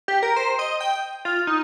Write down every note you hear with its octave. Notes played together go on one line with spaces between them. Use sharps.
G4
A#4
C5
D#5
G5
F4
D#4